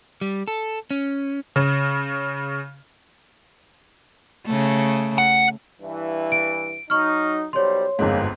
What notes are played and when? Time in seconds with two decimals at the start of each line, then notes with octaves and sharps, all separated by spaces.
0.21 G3
0.48 A4
0.91 C#4
1.56 C#3
4.46 C#3 A3
5.18 F#5
5.80 G2 E3
6.32 D7
6.90 F#3 D#4 C#6 F6
7.53 B1 G3 C5 C#5 C6
7.99 G1 F2 G#2 A#3